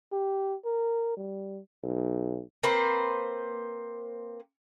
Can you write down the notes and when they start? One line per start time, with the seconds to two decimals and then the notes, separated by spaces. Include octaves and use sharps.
0.12 G4
0.65 A#4
1.17 G3
1.83 B1
2.63 A#3 C4 B4 C5